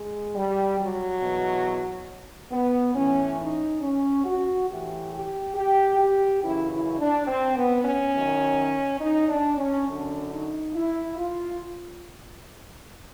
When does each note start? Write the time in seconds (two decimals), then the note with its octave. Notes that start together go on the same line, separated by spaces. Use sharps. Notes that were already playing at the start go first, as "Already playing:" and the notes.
Already playing: G#3
0.35 G3
0.78 F#3
1.21 E2 B2
2.51 B3
2.94 A2 E3 C#4
3.38 D#4
3.81 C#4
4.24 F#4
4.67 A2 E3 G4
5.11 G4
5.55 G4
5.97 G4
6.41 F#2 C#3 E3 E4
6.69 E4
6.98 D4
7.27 C4
7.56 B3
7.85 C#4
8.13 F#2 D#3
9.01 D#4
9.29 D4
9.58 C#4
9.86 F#2 D3 D4
10.30 D#4
10.74 E4
11.16 F4